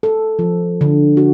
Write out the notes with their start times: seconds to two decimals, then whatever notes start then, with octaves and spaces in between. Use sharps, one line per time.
0.03 A4
0.39 F3
0.81 D3
1.17 F#4